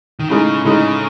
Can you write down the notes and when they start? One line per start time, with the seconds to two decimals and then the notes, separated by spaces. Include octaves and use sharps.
0.19 D#3
0.29 A2 C#3 G#3 D#4
0.65 A2 C#3 G#3 D#4